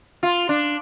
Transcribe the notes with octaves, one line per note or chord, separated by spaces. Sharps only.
F4
D4